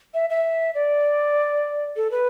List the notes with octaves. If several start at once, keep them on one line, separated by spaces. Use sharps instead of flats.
E5
E5
D5
A4
B4